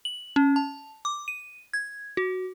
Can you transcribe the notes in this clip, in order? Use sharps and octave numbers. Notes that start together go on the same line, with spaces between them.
F#7
C#4
A5
D6
D#7
G#6
F#4